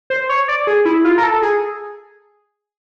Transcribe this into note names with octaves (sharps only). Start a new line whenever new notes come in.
C5
C#5
D5
G#4
E4
F4
A#4
A4
G#4